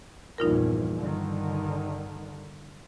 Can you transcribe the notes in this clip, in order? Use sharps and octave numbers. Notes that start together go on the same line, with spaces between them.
A#1 E2 G2 D#4 F4 A#4
G2 D3 D#3